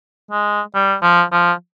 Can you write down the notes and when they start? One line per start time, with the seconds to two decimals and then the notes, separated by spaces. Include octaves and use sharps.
0.31 G#3
0.75 G3
1.02 F3
1.32 F3